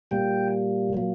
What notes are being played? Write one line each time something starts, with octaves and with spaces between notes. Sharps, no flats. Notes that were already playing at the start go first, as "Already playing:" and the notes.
A#2 G3 A#3 G5
A#2 F#3 A#3